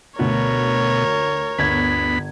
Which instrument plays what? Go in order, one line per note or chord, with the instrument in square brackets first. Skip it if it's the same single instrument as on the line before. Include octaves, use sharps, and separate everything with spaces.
[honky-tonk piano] D2 [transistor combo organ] B2 [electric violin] A#4 C#5
[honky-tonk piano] G1 G#6 [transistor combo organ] D2 B3 B5